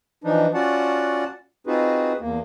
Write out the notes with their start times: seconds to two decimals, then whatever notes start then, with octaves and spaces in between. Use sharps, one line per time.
0.24 E3 F3 D4 D#4
0.54 C#4 F4 F#4 D5 F#5 A5
1.67 C4 D#4 F4 F#4 G#4 B4
2.20 E2 A#3